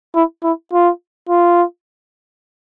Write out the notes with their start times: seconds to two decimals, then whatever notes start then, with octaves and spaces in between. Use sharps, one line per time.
0.15 E4
0.43 E4
0.73 F4
1.29 F4